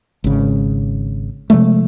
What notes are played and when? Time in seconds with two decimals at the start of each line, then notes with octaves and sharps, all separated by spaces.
0.24 G#1 C#3
1.50 C3 F3 G#3 A3